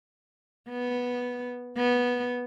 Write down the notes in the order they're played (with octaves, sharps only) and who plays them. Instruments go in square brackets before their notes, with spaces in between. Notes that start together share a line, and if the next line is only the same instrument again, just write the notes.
[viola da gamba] B3
B3